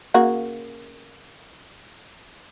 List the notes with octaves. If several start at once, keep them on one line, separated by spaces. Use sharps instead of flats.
C#3 A#3 F#4